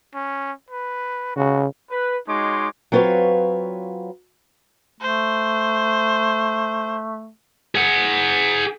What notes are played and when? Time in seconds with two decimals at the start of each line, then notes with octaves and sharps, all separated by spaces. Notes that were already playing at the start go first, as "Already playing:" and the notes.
0.14 C#4
0.70 B4
1.36 C#3 F#4
1.90 B4
2.27 G#3 D#4 F#4 C#5 C6 D6
2.92 F#3 C4 F4 B4 C#5
5.01 A3 C5
7.75 G#4 F#5